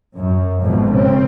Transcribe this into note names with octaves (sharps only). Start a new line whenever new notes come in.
F#2
G#1 F2 G#2 B2
C#3 C4